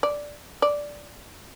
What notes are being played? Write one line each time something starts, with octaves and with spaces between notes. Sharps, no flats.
D5
D5